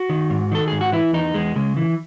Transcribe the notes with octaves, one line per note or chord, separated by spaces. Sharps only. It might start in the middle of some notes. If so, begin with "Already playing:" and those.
Already playing: F#4
D#3
G#2
D#3 A4
G#2 G#4
F#4
E3 E4
E2 D#4
E2 G#3
C#3 G#3
E3